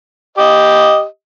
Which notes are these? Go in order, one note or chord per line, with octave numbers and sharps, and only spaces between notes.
G4 D#5